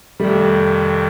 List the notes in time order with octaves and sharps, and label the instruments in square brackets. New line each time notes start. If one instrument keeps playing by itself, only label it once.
[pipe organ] F2 C3 D#3 [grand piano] G3 A3